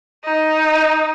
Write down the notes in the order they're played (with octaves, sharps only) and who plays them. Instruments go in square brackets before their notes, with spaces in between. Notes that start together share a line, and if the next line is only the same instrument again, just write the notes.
[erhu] D#4